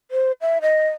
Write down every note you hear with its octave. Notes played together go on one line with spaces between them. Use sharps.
C5
E5
D#5